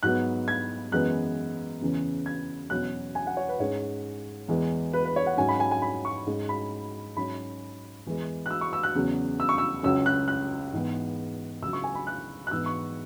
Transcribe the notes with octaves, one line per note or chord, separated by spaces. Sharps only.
G#2 F#3 B3 F#6
G#6
F#2 E3 G#3 B3 F#6
E2 C#3 E3 C#4
G#6
E2 B2 F#3 C#4 F#6
G#5
F#5
C#5
B4
G#2 G#3 C#4 C#5
E2 E3 G#3
B4
B4
C#5
F#5
G#2 F#3 C#4 G#5
B5
G#5
G#5
B5
C#6
G#2 G#3 C#4
B5
G#2 F#3 C#4 B5
E2 E3 G#3
F#6
E6
C#6
E6
F#6
E2 C#3 F#3
E6
C#6
E6
C#2 C#3 F#3 C#4 E6
F#6
F#6
G#2 E3 B3
C#2 C#3 F#3 E6
C#6
G#5
B5
F#6
F#6
G#2 E3 B3 E6
C#6